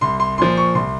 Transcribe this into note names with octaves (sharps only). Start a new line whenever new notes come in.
C2 C6
C6
A#2 F3 C6
C#6
C2 C6